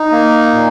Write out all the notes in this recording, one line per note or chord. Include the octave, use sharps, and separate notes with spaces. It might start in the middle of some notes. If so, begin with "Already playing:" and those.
Already playing: D#4
A#3
A#2